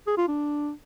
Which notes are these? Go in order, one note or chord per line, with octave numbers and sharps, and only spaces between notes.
G#4
F4
D4